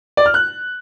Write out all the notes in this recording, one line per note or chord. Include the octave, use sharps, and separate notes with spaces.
D5
F6
F#6